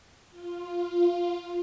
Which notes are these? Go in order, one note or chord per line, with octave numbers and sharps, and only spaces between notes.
F4